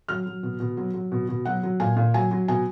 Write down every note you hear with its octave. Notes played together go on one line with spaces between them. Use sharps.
F#3 F6
F#3
B2
B2
F#3
F#3
B2
B2
F#3 F#5
F#3
A#2 G#5
A#2
F#3 G#5
F#3
B2 G#5